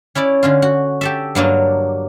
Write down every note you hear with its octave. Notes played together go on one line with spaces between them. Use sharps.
C#4 E4 C#5 D5
D3 C#4 F4
F#4
G4 A4 E5
G2 F#3 A#3 D4